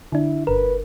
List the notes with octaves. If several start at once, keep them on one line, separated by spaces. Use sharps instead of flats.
D3 D4 E4
G1 A#4 B4